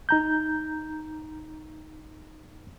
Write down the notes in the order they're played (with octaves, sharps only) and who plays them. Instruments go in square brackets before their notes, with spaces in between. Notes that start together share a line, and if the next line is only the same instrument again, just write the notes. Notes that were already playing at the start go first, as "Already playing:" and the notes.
[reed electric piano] D#4 A#5 G6